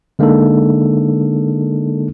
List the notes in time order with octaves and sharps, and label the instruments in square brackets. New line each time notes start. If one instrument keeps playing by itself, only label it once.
[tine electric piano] D3 G#3 A#3 D4 D#4 A4